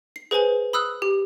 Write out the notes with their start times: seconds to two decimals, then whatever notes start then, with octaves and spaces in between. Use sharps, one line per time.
0.16 C7
0.31 G#4 B4 C5 G#5 F#7
0.73 B5 D#6 E6 F#6
1.02 G4